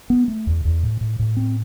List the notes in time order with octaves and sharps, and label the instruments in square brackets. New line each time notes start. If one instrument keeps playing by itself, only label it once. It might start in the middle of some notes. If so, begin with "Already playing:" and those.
[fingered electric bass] B3
A3
E2
E2
A2
A2
A2
C4